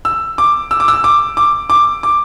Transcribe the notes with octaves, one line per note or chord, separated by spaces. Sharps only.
E6
D6
E6
D6
E6
D6
D6
D6
D6